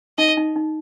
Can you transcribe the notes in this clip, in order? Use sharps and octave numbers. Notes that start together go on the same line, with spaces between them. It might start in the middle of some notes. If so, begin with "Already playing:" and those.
D#4 D#5
D#4
D#4